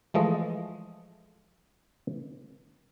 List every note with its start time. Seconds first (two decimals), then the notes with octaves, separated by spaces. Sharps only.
0.14 E3 F3 G#3 A3 D#5